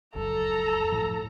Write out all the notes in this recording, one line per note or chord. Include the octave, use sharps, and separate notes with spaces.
F1 C#2 F#2 A4 A#5
A2 F3